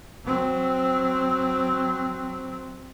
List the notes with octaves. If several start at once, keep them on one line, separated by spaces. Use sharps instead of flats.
F#3 C4